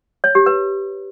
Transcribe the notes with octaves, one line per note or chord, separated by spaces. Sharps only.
C#5
G4
B4